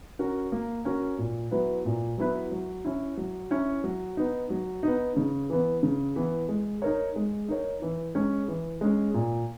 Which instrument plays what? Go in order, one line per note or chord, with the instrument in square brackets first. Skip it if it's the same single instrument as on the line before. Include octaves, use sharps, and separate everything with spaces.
[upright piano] C#4 F#4 A#4
A#3
C#4 F#4 A#4
A#2
F#3 B3 E4 B4
A#2
F#3 B3 E4 B4
F#3
C#4 E4
F#3
C#4 E4
F#3
B3 D#4
F#3
B3 D#4
C#3
E3 B3
C#3
E3 B3
G#3
D#4 A#4 C#5
G#3
D#4 A#4 C#5
E3
G#3 C#4
E3
G#3 C#4
A#2